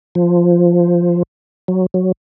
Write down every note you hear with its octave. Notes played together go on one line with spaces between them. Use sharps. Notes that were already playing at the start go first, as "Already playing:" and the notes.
F3
F#3
F#3